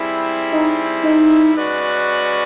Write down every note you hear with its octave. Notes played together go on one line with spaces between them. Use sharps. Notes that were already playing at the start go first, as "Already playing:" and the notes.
Already playing: G3 C4 E4 G#4
D#4
D#4
G#3 C#4 F#4 B4 D5